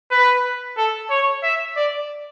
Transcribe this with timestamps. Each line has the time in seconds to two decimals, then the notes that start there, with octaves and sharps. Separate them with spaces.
0.11 B4
0.77 A4
1.10 C#5
1.43 E5
1.77 D5